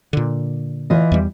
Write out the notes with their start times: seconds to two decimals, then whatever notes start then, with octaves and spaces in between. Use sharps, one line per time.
0.13 A#2 D3
0.90 E3 F4 D#5
1.12 E2 G3